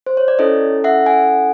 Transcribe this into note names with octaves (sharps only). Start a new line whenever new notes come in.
C5
C#5
D5
C#4 E4 A4 C#5 D#5
E5 F#5
F#5 G#5